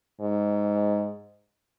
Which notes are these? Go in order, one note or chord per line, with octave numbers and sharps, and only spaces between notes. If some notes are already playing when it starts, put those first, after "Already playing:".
G#2